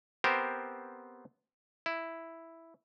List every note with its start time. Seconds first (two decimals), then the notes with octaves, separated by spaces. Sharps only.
0.24 B3 C4 G4 A#4 C5
1.86 E4